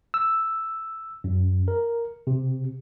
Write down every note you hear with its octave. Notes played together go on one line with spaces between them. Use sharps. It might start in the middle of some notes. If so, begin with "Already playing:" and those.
E6
F#2
A#4
C3